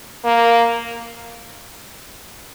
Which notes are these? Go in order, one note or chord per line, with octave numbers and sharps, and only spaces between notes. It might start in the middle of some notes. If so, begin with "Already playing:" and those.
A#3